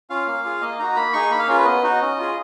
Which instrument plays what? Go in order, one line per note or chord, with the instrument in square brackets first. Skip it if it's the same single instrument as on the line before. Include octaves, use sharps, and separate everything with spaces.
[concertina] C#4 F4 F5
A#3
F4 G#4
A#3 D#5
D#4 F#4 A#5
A#3 B5
D#4 G#4 C#6
A#3 B5
F5
C#4 F4 G#4 A#4
B4
B3 D#5
D#4 F#4
C#4
F4 G#4